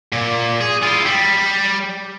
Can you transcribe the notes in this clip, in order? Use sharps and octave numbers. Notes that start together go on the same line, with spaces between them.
A#2
G#4
E4 F4
G3